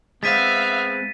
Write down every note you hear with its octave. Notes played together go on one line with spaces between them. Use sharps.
G#3 B3 C4 E5 F5 A6 B6 D#7